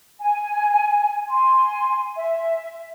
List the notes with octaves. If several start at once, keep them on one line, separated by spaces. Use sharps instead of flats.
G#5
G#5 C6
E5